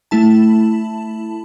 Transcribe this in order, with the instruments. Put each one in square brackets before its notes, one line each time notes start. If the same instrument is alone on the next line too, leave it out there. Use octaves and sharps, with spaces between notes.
[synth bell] A3 E4 A5